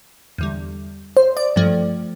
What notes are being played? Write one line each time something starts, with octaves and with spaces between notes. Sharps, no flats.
E2 D3 G3
C5
D5
G2 F3 A3